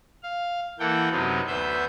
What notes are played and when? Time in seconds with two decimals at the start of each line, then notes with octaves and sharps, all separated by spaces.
0.23 F5
0.79 E3 A#3 A4 F#5 G5
1.11 F#2 C3 F#3 B3 C4 D#4
1.47 D2 B3 C5 E5 G6